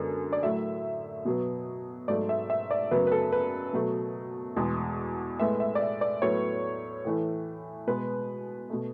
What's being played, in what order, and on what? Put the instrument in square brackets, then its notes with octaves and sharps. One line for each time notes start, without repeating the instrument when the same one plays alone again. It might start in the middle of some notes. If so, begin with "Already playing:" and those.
Already playing: [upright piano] F#2 D3 G#3 B3
D5
A2 F#3 A3 E5
B2 F#3 B3
G#2 F#3 A3 D5
E5
E5
D5
F#2 C#3 F#3 B3 B4
B4
A4
B4
B2 F#3 A3
E2 B2 G#3
A2 G#3 B3 E5
E5
D5
E5
D5
A2 F#3 B3 C#5
A2 E3 A3
B2 G#3 B3 B4
B2 A3